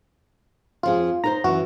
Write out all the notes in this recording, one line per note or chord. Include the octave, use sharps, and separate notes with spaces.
F2 F3 F4 G#4
D#4 A#4 C5 A#5
F#2 E3 F#4